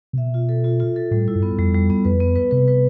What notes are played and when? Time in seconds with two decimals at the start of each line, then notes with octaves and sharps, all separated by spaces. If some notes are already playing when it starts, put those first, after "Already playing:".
0.13 C3
0.18 B2 E5
0.34 F4
0.49 A4
0.64 F4
0.80 F4
0.96 A4
1.11 A2 G3
1.28 E4
1.35 G2
1.43 B3
1.58 F2 G3
1.74 G3
1.90 B3
2.05 F2 B4
2.20 B3
2.36 B4
2.51 C3 B4
2.68 B4